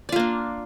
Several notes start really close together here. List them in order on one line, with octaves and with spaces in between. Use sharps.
D5 F4 A#3 D4